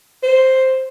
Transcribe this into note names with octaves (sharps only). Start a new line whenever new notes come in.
C5